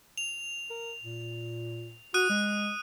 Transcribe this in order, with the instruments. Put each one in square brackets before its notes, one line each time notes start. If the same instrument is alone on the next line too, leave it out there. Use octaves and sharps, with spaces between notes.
[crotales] F7
[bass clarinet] A#4
A#2
[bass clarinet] F#4 [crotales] D#6 F#6 D#7
[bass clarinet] G#3